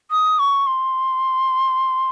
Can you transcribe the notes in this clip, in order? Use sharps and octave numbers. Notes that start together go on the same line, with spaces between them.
D#6
C#6
C6